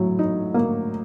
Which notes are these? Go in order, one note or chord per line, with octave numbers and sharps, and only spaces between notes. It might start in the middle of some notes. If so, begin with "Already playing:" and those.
Already playing: A2 F#3
D#4
A#3